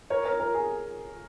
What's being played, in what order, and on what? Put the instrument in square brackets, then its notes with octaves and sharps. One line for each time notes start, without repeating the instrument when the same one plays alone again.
[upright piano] A#4 C#5
A#4 C#5
A#4
G#4